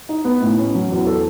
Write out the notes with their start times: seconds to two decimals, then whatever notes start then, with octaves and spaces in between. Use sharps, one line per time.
0.09 D#4
0.25 B3
0.42 A2
0.58 C#4
0.75 F#3
0.90 E2
1.07 A4